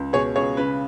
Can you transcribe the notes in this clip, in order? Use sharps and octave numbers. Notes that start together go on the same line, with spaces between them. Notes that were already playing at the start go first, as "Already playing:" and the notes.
Already playing: C#2
B2 G#4 C#5
C#2 G#4 C#5
C#3 B4